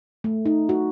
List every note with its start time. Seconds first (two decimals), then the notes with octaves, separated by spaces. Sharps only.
0.24 A3
0.46 D#4
0.69 F#4